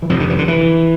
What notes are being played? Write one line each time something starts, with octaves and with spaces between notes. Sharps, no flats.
E3
F2 C3 F3
D3
E3
D3
E3